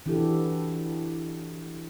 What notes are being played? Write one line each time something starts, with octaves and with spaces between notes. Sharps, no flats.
E3 D4 E4 F#4 G4 A4